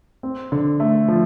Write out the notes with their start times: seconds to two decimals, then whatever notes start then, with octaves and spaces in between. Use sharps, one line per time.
0.23 C4
0.52 D3
0.80 A3
1.08 F3